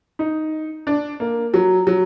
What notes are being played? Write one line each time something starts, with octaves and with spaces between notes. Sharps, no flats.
D#4
D4
A#3
F#3
F#3